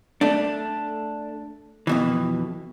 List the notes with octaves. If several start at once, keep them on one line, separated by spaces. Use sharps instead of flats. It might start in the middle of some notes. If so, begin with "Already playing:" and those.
A3 D4
F2 B2 E3